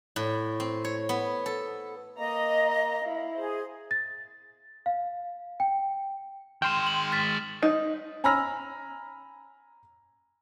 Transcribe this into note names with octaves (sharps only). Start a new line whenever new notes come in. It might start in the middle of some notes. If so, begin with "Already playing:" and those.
A2
C4
C#5
B3
A4
A#3 D#5 A#5
E4 F5
G#4 C5
A6
F5
G5
D#3 G#3 G5 C6 F6 E7
F#7
F6 A6 B6
D#4
G#5 A#5 B5 E6 F6 A#6